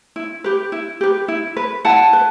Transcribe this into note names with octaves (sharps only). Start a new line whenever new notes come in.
E4
G4 B4
E4
G4 B4
E4
B4
E4 F#5 A5
B4